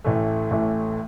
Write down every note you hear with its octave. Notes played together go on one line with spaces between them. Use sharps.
A1 A2 E3 A3
A1 A2 E3 A3